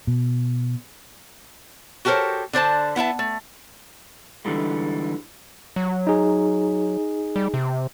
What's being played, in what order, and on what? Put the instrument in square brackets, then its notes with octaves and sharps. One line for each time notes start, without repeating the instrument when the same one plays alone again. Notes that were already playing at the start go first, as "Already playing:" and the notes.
[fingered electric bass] B2
[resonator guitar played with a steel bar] F#4 G4 A4 A#4 C5 C#5
D3 D4 C5 A5
B3 E4 E5 A5
A3
[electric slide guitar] D3 E3 G3 G#3
[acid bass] F#3
[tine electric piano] D#4 G#4
[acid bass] G3
C3